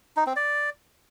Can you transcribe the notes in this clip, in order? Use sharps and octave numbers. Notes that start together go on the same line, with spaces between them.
D#4
C4
D5